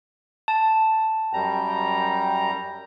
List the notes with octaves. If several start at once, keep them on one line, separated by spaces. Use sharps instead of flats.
A5
F#2 G3 G5 A#5